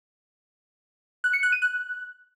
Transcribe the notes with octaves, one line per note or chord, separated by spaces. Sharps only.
F#6
C#7
F#6
D#7
F#6